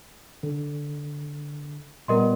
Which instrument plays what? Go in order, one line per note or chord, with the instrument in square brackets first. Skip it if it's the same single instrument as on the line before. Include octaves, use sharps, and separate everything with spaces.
[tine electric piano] D3
[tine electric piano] A#2 G3 B3 [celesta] A#4 D#5 C6